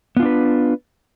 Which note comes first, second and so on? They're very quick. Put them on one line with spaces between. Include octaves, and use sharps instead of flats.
B3 F4 D4 B4